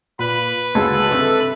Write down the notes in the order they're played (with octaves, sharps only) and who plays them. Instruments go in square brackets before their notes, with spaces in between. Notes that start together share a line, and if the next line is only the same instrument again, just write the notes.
[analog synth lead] A#2 [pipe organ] B4 [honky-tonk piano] B5
[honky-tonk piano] D2 C#3 G#3 [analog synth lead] A4
[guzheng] G2 A3 D#4 [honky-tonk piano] C3